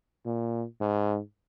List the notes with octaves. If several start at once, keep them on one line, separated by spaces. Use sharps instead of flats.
A#2
G#2